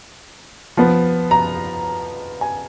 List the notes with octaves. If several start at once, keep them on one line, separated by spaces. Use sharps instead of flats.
F3 B3
A#5
G#5